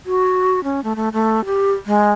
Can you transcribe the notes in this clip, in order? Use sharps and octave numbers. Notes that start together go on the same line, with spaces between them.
F#4
C#4
A3
A3
A3
G4
G#3